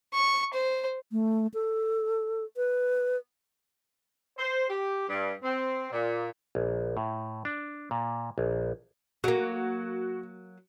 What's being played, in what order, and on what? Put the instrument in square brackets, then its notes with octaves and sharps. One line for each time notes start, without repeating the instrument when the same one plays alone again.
[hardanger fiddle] C#6
C5
[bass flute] A3
A4
B4
[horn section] C5
G4
G2
C4
A#2
[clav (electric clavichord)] A#1
A2
D4
A#2
A#1
[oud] F#3 A#3 [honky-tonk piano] F#4